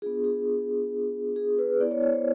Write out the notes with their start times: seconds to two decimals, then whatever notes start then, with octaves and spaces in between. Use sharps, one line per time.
0.02 B3 D4 F4 G#4
0.24 G#4
1.36 G#4
1.58 B4
1.80 B3 E4 D5
1.91 C#5
2.02 C#5
2.13 C5